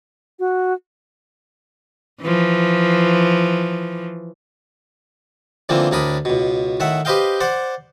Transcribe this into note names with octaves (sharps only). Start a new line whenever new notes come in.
F#4
E3 F3
D3 E3 F3 A3 A#3 C4
D2 A2 D4 A#4 B5 D#6
C#2 B2
A2 D#3 E5 F#5
G4 B4 C5 D#5 F5 G5
C5 D5 F#5